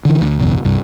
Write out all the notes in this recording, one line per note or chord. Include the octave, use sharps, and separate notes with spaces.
D3 E3
D2
F#1 B1 E2
C2 G2